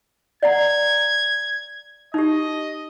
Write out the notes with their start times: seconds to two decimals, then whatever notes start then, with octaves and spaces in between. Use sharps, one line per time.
0.43 D5 F#5 A#5 G#6
2.14 D#4 G4 D#5